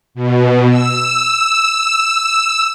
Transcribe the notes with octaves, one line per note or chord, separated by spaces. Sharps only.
B2
E6